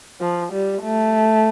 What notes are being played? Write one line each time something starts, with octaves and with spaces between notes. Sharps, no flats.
F3
G3
A3